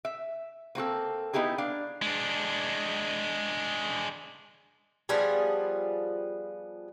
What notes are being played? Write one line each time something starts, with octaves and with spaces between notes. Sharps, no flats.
E5
A#3 C4 F#4 A4
B3 D#4 E4 G4 G#4
D4 F5
G#3 D4
F3 G3 B3 G#4